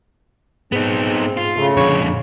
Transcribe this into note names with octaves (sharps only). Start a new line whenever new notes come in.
G#2 B3 C4 D#4 G#4
F4
C#3 A3
F2 A#2 D3 D4 C#5